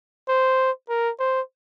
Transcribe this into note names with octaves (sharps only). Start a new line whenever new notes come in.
C5
A#4
C5